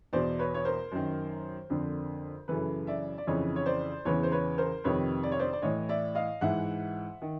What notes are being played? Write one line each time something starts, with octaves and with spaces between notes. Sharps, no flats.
E2 B2 C5 D5
B4 C#5
C#5
A#4 C5
F#2 D#3
F2 D3
F#2 C#3 E3 A4 B4
D5 E5
D5
F2 C#3 E3 C#5 D#5
C#5
C5 D5
E2 C#3 E3 B4 C#5
C5
B4 C#5
A#4 C5
F2 C3 D#3 B4 C#5
D5
C#5
C5 D5
D5
A2 E3 C#5 D#5
D5 E5
D#5 F5
G#2 E3 E5 F#5
D#3